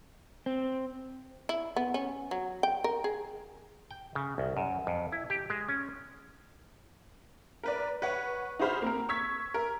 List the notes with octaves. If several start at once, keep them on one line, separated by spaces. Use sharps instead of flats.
C4
E4
B3
C#4
F#3
G5
A#4
G#4
G5
C#3
C2
F#2
F2
E4
G4
G#3
C#4
A#4 B4 D5
B4 C#5 F#5 C#6
D#4 F#4 G#4 C5 B5 F6
A#3 C4 A#4
C#6 E6 G#6 B6
A#4